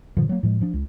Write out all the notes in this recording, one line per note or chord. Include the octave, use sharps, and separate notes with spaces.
G2 A#2 D3 F3
F#3 A#3
A2 F3 G#3
F3 D4
C#2